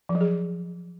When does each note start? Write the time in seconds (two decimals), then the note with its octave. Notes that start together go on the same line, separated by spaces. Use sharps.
0.09 F3
0.15 F#3
0.21 G#4